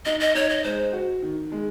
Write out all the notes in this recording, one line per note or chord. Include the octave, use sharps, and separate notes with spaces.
D#4 D#5
D#5
D#4 C#5
D#5
G#3 C5
F#4
D#3
G#3